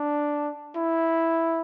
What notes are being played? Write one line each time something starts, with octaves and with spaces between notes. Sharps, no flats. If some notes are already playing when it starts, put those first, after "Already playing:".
Already playing: D4
E4